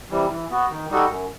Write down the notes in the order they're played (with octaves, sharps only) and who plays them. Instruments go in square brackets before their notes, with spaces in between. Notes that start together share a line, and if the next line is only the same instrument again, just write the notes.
[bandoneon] C3 E3 G3
E3
B3 F#4
D#3
G3 D#4 F#4 A4
F#2